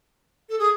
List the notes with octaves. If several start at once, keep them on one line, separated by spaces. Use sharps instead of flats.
A4
G#4